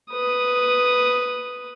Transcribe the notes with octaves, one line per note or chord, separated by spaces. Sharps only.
B4 D#6